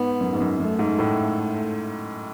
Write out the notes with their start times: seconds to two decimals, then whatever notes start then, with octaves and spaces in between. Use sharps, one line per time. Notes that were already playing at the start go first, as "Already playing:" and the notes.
Already playing: G#2 B3
0.21 F#2
0.33 G#2
0.40 F#2
0.60 F#2 A3
0.79 G#2
0.99 A2